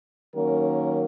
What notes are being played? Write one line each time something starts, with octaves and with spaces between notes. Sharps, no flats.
D#3 F#3 A#3 C#4 A#4